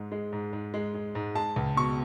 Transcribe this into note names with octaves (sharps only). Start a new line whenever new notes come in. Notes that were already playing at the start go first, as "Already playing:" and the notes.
Already playing: G#2 G#3
G#3
G#2
G#2
G#3
G#3
G#2
G#3 A5
C#2
B2 C#6